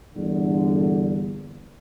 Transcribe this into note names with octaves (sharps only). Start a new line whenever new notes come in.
E2 G2 A#2 D3